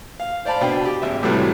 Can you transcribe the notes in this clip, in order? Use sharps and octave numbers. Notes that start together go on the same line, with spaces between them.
F5
C5 D5 F5 A5 B5
B2 D4 G5
G4
G#1 E5
A2 C3 E3 F#3 G3 A3